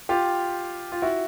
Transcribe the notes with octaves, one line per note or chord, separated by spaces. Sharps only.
F4 G4
F4
E4 F#4